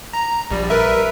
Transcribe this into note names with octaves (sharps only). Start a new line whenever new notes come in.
A#5
A#1 G3
A#4 B4 E5